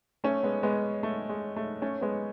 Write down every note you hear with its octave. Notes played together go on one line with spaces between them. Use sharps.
A3 C#4
G#3 B3
G#3 B3
A3
G#3
A3
A3 C#4
G#3 B3